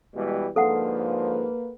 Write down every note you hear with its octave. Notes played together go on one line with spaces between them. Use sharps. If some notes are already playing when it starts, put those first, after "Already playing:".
B2 E3 G3 G#3
G#2 D3 F3 A#3 A4 B4 F5 F#5